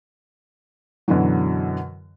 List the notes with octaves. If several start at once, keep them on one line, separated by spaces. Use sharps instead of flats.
F#2 B2 D3 E3 F#3